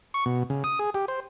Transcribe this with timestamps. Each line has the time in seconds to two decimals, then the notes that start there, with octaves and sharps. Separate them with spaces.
0.14 C#6
0.26 B2
0.50 C#3
0.64 D#6
0.79 G#4
0.94 G4
1.08 C5